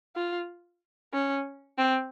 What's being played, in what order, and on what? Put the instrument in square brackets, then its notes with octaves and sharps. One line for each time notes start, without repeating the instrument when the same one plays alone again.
[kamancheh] F4
C#4
C4